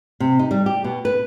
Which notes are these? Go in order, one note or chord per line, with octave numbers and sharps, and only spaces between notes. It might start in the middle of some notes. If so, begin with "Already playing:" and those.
C3
D#4
G3
G4
B2
B4